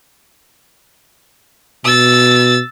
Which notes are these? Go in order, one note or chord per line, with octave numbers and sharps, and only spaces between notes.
B2 E6 A6